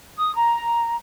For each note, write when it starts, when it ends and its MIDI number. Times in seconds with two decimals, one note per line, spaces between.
0.17 0.33 87
0.35 0.95 82